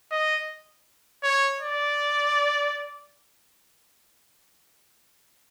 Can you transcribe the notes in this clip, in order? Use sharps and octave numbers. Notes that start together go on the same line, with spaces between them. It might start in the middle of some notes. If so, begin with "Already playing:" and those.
D#5
C#5
D5